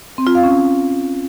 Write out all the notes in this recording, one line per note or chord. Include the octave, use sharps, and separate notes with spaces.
C4
F4
F5
C#4